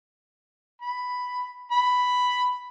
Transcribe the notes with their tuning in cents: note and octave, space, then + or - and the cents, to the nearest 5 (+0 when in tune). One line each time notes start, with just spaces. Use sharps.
B5 +5
B5 +5